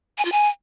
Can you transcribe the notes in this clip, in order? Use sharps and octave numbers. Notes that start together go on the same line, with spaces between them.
G#5
F4
G#5